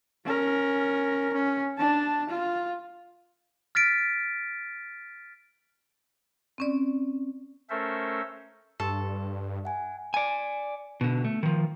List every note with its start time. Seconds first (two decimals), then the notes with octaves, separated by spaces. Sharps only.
0.25 C#4 A#4
1.34 C#4
1.78 D4 A5
2.30 F4
3.75 F6 A6 B6 D7
6.58 C4 C#4 D5
7.70 A3 C#4 A4 A#4 C5 E5
8.80 G2 A4 C6 C#6
9.64 E5 F#5 G#5
10.14 D5 G#5
11.01 B2 D3
11.25 A3
11.43 D#3 F3